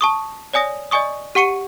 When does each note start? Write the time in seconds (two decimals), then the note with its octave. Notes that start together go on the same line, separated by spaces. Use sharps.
0.01 A5 C#6 D#6
0.53 C#5 D5 G#5 D#6 A#6
0.91 D5 D#5 G#5 C#6 D#6
1.35 G4 F#5 C#6 C#7 D#7